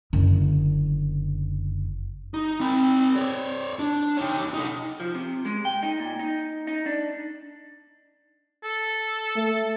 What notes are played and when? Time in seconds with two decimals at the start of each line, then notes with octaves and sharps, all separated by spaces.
0.13 F#1 D3
2.34 D#4
2.61 C4 B5
3.16 C#5 D5
3.79 D4
4.17 D#4 C#5
4.54 D#4 A4
5.00 F3
5.15 C3
5.45 G#3
5.65 G5
5.83 D#4
6.00 A#2
6.19 D#4
6.67 D#4
6.86 D4
8.64 A4
9.36 A3